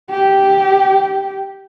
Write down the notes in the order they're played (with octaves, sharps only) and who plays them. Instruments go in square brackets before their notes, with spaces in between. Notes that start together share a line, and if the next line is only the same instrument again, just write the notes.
[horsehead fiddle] G4